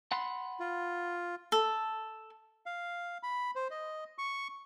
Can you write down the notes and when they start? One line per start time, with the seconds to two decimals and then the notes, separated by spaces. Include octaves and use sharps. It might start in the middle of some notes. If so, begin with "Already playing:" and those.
0.12 F#5 B5 C6
0.60 F4
1.52 A4
2.66 F5
3.23 B5
3.55 C5
3.70 D#5
4.18 C#6